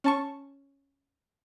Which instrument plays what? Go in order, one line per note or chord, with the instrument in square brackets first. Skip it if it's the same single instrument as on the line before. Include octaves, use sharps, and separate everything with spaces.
[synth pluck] C#4 A5 C#6